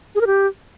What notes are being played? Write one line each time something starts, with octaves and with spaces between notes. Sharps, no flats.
G#4
A#4
G4